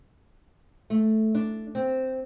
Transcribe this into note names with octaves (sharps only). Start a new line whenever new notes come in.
A3
D4
C4